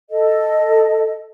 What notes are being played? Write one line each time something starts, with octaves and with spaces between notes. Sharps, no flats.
A4 D#5